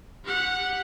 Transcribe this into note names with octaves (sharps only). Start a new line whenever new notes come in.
G4 F#5